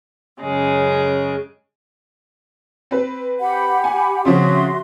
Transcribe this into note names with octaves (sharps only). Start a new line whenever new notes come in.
F#2 C#3 G#3
C4 B4
G4 F#5 B5
G#5
C#3 F3 C4 F#4 E5 C6